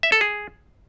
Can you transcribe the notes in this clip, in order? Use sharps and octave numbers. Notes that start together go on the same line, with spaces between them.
E5
A4
G#4